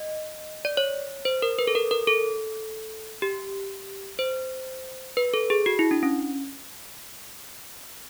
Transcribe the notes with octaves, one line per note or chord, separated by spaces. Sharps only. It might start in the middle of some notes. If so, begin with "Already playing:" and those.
Already playing: D#5
D5
C#5
C5
A#4
B4
A4
A#4
A#4
A4
G4
C5
B4
A4
G#4
F#4
E4
D4
C#4